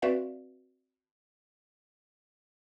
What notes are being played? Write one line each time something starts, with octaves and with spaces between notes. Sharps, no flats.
C4 F#4 B4 D5 E5 F5